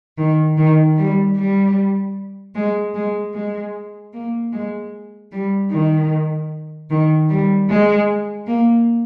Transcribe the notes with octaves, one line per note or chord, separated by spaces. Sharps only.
D#3
D#3
G3
G3
G#3
G#3
G#3
A#3
G#3
G3
D#3
D#3
G3
G#3
A#3